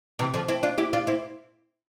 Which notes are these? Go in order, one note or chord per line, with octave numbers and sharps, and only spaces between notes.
C3 E3
D3 F3
C4 E4
D4 F4
E4 G4
D4 F4
C4 E4